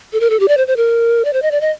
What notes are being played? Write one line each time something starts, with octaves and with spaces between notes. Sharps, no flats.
A4
A#4
A4
G4
D5
C5
C5
A#4
D5
C5
D#5
D5
D#5